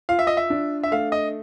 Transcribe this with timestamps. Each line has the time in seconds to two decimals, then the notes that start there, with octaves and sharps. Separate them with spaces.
0.09 F4 F5
0.19 E5
0.27 D#5
0.37 E5
0.50 D4
0.83 E5
0.92 A3 F5
1.12 D#5